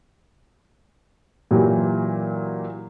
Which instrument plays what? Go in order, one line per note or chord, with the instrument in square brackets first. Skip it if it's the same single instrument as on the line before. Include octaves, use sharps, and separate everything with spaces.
[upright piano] A#2 E3 F#3 G4